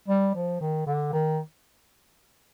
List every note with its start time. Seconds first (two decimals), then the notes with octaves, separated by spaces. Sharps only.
0.08 G3
0.35 F3
0.61 D#3
0.86 D3
1.13 D#3